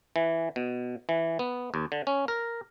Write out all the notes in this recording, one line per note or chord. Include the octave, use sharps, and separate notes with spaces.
E3
B2
E3
B3
D#2
D3
C#4
A#4